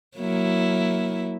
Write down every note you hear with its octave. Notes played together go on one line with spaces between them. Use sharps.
F#3 A#3 E4